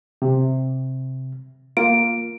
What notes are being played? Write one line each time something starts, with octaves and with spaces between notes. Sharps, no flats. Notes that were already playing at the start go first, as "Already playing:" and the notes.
C3
A#3 F4 D7